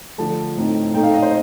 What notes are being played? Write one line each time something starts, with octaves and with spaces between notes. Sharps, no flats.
D3 F3 A3 A5
A2 A3 C4 D#4
A#2 A3 C4 D#4 G5
F5
D#5
C5